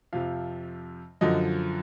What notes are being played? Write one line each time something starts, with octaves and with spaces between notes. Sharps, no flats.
F2 C3 F3 F5
F#2 D3 F3 D#5